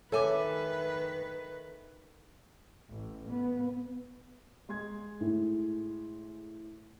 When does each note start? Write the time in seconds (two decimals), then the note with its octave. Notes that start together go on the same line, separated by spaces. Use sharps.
0.12 D#3 A4 B4 C#5 E5 G#5 D6
2.89 A1
3.28 B3
4.69 G#3 C6 G#6
5.21 A2